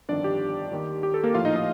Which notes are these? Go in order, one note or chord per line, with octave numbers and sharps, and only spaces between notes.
G1 F2 D#3 D4 D5
G4
D#2 D#3
G4
A4
A#3 A#4
A#1 A2 F3 F4 F5
D#4 D#5
D#4 D#5